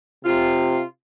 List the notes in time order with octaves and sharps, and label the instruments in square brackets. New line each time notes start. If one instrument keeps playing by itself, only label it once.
[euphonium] C3 [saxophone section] F4